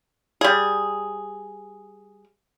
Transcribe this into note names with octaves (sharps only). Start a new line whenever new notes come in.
G3 G#4